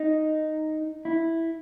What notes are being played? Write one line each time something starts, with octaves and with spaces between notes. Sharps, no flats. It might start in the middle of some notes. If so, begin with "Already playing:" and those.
Already playing: D#4
E4